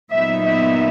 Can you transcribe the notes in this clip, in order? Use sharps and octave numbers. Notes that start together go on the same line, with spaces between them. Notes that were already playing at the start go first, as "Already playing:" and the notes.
A#2 F#3 B3 D#4 E5
E5